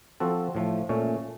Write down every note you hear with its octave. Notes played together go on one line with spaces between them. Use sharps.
F3 C4 F#4 A4
A2 F3 A3
A#2 A3 C#4